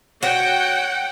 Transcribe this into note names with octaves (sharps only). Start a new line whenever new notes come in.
F#4 C#5 F#5 G5